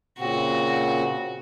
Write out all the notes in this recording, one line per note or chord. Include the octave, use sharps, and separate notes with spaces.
A#2 C#3 C4 F#4